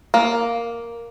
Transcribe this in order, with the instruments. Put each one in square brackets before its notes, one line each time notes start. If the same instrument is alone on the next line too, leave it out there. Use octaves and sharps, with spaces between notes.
[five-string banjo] A#3